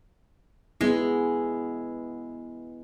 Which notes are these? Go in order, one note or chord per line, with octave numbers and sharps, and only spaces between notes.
G#3 B3 E4